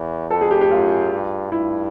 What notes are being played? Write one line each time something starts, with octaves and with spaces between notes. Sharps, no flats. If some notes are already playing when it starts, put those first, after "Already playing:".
Already playing: E2
F2 A4
G#4
G4
G4
F#2 F4
G2
G2 E4